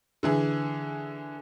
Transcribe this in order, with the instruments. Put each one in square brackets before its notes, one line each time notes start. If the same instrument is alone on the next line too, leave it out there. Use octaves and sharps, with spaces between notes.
[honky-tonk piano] D3 E3 G#4